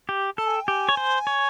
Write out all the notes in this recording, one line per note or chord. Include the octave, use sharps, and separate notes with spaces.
G4
A4 A5
G#5
G5
G4 G#5
C#5
C5
C#5